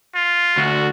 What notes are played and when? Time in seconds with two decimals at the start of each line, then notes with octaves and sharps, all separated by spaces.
0.15 F4
0.57 D2 F#4